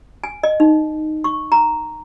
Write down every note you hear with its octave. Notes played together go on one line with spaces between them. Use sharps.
G#5
D#5
D#4
C#6
A#5